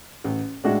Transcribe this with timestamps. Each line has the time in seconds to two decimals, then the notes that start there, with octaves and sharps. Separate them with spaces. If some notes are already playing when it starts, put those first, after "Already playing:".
0.24 A1
0.64 A2 G#3 D4 F#4